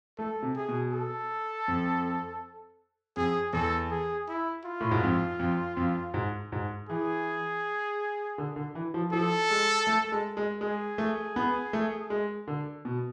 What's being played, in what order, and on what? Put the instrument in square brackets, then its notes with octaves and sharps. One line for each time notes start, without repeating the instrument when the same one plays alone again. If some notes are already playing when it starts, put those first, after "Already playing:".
[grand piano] A3 [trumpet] A4
[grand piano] C3
[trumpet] G#4
[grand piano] B2
[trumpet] A4
[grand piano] F2
[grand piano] F2 [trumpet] G#4
[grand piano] E2 [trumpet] A4
[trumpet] G#4
E4
F4
[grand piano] A2
G#2
F2
F2
F2
G#2
G#2
[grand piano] E3 [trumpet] G#4
[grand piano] D3
D3
E3
F3
[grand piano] F3 [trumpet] A4
[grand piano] G#3
A3
G#3
G#3
[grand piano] G#3 [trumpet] G#4
[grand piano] A3
B3
A3
G#3
D3
B2